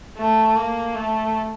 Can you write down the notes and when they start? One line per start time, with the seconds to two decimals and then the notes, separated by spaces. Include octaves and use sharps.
0.17 A3
0.56 A#3
0.95 A3